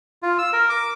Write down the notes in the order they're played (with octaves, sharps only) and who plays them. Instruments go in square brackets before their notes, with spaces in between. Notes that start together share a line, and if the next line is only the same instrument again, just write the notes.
[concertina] F4
E6
A#4
D6